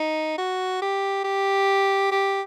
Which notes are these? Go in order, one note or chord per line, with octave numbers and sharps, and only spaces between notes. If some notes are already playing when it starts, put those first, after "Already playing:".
Already playing: D#4
F#4
G4
G4
G4